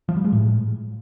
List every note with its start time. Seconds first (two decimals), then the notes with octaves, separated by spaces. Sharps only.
0.09 F3
0.17 G3
0.24 G#3
0.32 A2